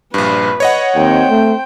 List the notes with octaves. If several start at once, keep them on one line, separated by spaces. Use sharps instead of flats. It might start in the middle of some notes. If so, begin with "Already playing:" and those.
A#1 G2 B4
C#5 D#5 F#5
D#2 C4 C5 G5
A3